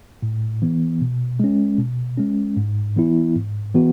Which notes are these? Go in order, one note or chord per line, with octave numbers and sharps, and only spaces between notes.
A2
E3 B3
B2
G#3 C#4
B2
G#3 C#4
G#2
E3 B3 E4
G#2
E3 B3 F#4